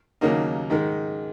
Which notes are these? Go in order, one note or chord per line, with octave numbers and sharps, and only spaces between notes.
D#2 C#3 F#3 A#3 D#4
G#2 D#3 G#3